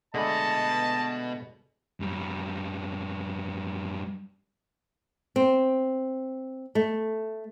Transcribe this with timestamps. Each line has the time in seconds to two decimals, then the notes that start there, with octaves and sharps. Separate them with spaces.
0.14 B2 D3 G#3 A3 D#5 A5 B5
2.00 F#2 G3
5.36 C4
6.75 A3